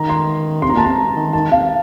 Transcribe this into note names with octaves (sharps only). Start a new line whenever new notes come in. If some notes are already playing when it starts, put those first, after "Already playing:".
Already playing: D#3 A#5
C6
C3 C6
A#5
A#2 A5
C3 A#5
D#3
D#3 A5
C3 F5